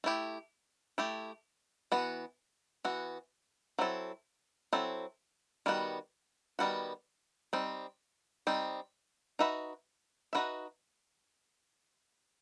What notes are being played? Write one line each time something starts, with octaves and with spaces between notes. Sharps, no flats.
A3 E4 G4
A3 E4 G4
E3 B3 F#4
E3 B3 F#4
F#3 C4 E4 A4
F#3 C4 E4 A4
D#3 G3 B3 F#4
D#3 G3 B3 F#4
G3 C4 D#4
G3 C4 D#4
D#4 F#4 B4 E5
D#4 F#4 B4 E5